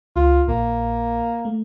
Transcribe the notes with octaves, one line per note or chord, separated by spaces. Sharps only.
C#2 F4
A#1 A#3
A3